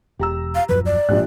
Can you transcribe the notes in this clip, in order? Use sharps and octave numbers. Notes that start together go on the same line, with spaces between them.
E1 G4 A#5 E6
F5
D#1 F#2 F3 B4
D5
A#1 G#2 G4 F#6